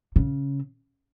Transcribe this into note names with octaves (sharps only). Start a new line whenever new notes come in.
C#3